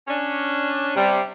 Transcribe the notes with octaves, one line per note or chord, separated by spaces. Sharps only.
C#4 D4
C3 G3